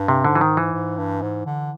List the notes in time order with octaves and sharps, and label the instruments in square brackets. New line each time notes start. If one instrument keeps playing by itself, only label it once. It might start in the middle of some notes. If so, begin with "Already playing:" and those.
Already playing: [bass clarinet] G2
[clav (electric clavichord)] C3
[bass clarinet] G#2 [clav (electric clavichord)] D3
[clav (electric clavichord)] E3
D#3
E3
[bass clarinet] G#2
G2
G#2
D3